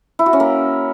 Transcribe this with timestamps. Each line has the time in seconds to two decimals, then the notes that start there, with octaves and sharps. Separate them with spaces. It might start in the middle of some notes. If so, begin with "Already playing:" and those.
0.19 E4
0.26 F#4
0.33 C#4
0.40 A#3